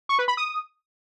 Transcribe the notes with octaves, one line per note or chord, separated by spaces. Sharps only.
C#6
B4
B5
D#6